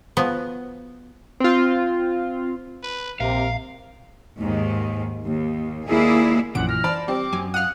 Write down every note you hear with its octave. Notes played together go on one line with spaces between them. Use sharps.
F3 B3 F#4
C4 F4
B4
A#1 C3 A#4 F5
D#2 G#2 D#3
D#2
D#2 G#3 A#3 E4 G#4 D5
A#1 F#2 A#2 E3 F#5 D7
F6 A#6
E3 C5 D5 A5 B5
G3 C4 D6
F#2 G#5
F5 F#5 D#6 F6 F#6